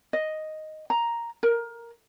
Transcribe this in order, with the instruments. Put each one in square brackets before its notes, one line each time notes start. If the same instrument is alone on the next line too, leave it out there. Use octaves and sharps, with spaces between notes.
[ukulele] D#5
A#5
A#4